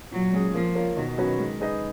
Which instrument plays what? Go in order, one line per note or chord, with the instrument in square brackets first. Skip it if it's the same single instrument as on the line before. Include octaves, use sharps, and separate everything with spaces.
[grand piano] A#2 [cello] F#3
[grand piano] G#3 C#4 G#4
[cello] F3 [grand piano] A#3
[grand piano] F4 A#4 C#5
[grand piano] B2 [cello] D#3
[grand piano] F#3 C#4 F#4 B4
G#3
D#4 G#4 B4 D#5